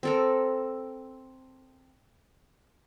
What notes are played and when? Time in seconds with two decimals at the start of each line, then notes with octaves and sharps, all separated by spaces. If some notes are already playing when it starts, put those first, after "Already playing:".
0.03 C4 A4 A#4